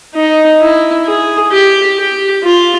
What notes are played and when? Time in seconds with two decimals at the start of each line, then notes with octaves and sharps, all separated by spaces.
0.15 D#4
0.60 E4
1.06 G#4
1.52 G4
1.97 G4
2.43 F4